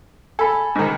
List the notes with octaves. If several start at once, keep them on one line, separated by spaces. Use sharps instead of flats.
A4 G#5 B5
G#2 D#3